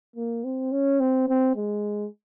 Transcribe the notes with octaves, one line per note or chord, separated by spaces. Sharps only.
A#3
C4
C#4
C4
C4
G#3